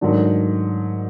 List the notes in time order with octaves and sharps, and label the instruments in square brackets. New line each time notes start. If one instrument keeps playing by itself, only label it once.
[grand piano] G#2 D#3 F#3 A3 D4